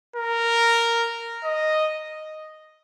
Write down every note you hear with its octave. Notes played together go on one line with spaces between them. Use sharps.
A#4
D#5